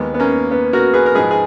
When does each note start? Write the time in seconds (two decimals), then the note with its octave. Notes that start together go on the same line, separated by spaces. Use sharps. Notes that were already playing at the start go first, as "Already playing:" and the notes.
Already playing: D#2 D#3 G#3 B3
0.14 B3
0.20 A#3 C#4
0.51 B3
0.73 F#4 A#4
0.94 G#4 B4
1.06 A#4
1.15 G#2 F3 G#3 G#4 B4
1.31 G#4